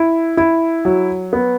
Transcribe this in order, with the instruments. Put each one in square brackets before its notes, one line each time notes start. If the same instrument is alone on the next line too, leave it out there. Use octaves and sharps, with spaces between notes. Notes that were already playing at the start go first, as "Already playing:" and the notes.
Already playing: [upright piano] E4
E4
F#3
B3